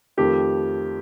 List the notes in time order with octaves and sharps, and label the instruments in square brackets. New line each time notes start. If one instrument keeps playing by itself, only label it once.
[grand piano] F2 D#3 A3 G4